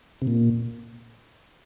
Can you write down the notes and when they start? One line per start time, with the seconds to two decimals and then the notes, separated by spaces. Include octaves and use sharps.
0.22 C3
0.27 A#2